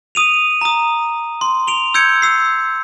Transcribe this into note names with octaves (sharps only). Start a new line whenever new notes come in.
D#6 D#7 F7
A#5 D#6
C6
D7 F7 G7
E6 G6 G#6 C#7 D7
E6 C7